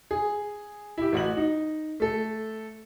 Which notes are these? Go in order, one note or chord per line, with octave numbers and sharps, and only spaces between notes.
G#4
E4 G4
A1 F#4 F#7
D#4
A3 A4